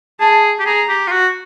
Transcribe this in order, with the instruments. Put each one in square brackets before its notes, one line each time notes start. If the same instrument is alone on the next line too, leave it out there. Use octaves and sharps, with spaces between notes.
[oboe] G#4 [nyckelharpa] A5
[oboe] G4
[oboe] G#4 [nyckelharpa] A#5
[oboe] G4
F4
F#4